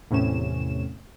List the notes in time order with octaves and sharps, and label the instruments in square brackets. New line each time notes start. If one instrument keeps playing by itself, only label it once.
[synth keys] E2 A2 C3 C#4 E7